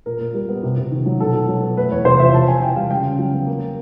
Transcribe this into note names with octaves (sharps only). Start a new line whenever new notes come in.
A#2 A#4
A#2
G3
B3
C3
C3
D#3
F#3
B2 A4
B2
F#3
B3
A3 B4
E2 C#5
C3 C5
F3 E5
C3 A5
C3 G#5
E3 G5
G3 F5
C#3 G5
C#3
F#3
B3
A#3